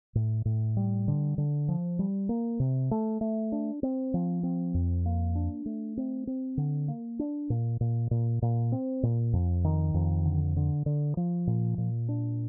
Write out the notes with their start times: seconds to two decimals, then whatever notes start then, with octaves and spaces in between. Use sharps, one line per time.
0.15 A2
0.45 A2
0.77 G3
1.08 D3
1.38 D3
1.68 F3
1.99 G3
2.29 A#3
2.60 C3
2.91 A3
3.21 A3
3.52 D4
3.83 C4
4.14 F3
4.43 C4
4.74 F2
5.06 A#3
5.35 D4
5.66 A3
5.97 C4
6.27 C4
6.57 D3
6.88 A#3
7.19 D4
7.50 A#2
7.81 A#2
8.11 A#2
8.42 A#2
8.72 C4
9.03 A#2
9.33 F2
9.64 D#3
9.94 F2
10.25 D3
10.56 D3
10.86 D3
11.17 F3
11.47 A#2
11.78 A#2
12.09 D4